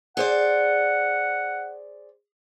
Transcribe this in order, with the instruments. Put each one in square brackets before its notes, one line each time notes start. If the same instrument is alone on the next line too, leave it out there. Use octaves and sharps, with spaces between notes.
[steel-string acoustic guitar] G#4 C5 D5 [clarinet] F#5